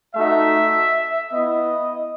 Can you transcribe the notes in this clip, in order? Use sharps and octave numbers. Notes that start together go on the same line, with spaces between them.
A3 D#4 F#4 E5
B3 E4 D#5